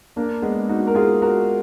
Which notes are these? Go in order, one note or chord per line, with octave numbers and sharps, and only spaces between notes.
A#3 D4
G#3 B3
D#4 F#4
A#4
F4 G#4
F#4 A#4